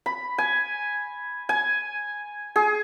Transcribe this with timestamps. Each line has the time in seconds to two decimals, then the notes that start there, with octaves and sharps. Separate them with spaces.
0.06 B5
0.38 G#5
1.49 G#5
2.56 G#4